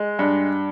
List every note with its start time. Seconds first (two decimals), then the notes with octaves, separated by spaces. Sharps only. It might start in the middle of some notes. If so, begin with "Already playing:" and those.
Already playing: G#3
0.19 G2